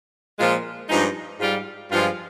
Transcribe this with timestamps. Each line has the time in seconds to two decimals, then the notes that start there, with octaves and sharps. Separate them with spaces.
0.38 A#2 F3 G#3 F4
0.88 G2 F3 G#3 D#4
1.39 G#2 G3 F4
1.90 G2 F3 G#3 F4